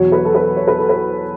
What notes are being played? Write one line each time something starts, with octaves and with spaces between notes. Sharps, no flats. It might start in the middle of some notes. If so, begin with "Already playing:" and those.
Already playing: E2 B2 F#3 C#5
B4
A4
B4
C#5
B4
A4
B4